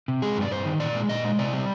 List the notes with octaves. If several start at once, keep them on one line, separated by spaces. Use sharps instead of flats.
C3
G#3 G#4
G2 D5
G2 C5
D#3
A#2 D5
G#3
A#2 D#5
G#3
C3 D5
G3